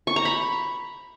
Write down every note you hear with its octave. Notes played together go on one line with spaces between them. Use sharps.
C#6
A#5
B5